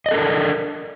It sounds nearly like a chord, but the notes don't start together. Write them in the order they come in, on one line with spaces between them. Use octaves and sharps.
D#5 D5 A4 A#4 D4